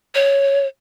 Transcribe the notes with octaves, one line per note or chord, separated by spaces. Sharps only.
C#5